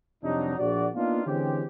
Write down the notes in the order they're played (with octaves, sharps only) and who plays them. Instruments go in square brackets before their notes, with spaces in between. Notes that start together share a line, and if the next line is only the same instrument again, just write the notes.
[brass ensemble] F2 C3 F#3 G3 D4 D#4
A#1 F#4 D5
A#3 B3 D4 D#4 F4
D3 E3 G#3 C4 C#4 G4